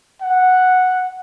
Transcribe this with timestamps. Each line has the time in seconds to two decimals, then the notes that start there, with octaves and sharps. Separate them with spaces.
0.22 F#5